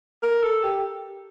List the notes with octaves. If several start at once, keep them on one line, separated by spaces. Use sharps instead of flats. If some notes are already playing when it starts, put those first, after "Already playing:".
A#4
A4
G4